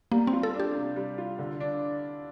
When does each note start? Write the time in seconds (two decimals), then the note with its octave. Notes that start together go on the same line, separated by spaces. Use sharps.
0.11 G3 A#3
0.27 C4
0.33 F4
0.43 A4
0.54 D4
0.60 G4
0.75 C3
0.96 G3
1.18 F4
1.39 D3
1.60 D4